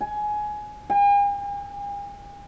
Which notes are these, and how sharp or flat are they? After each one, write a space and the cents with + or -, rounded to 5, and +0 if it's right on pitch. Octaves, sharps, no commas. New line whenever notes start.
G#5 +15
G#5 -45